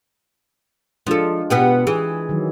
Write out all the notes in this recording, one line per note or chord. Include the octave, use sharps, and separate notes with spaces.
F3 G#3 D4 F4 A4
B2 B3 G4
E3 G#4
D#3 F#3